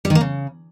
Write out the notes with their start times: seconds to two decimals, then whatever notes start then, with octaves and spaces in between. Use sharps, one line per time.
0.05 G3
0.10 D#3
0.15 A#3
0.21 C#3